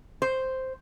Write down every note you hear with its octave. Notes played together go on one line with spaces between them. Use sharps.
C5